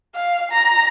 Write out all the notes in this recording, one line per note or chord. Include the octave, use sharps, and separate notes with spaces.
F5
A#5